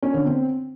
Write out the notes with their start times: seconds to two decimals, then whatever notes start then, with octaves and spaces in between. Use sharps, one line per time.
0.02 C#4
0.14 D3
0.25 C4